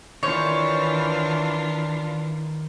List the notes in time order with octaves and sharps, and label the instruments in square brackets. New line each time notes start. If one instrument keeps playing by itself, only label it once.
[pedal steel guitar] D#3 C5 [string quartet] E3 D4 F4 [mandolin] C#5